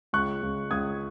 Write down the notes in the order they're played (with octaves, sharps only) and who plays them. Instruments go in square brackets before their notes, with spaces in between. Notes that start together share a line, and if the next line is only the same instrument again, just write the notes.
[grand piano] C#2 C#6 F#6
C#2
C#2 D#6 G#6